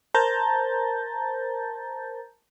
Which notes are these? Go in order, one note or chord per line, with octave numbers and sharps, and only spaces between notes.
A#4 C5 A5 A#5 G6 A6